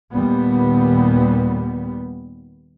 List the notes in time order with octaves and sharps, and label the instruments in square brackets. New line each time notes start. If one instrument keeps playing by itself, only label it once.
[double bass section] D#2 A#2 G3 B3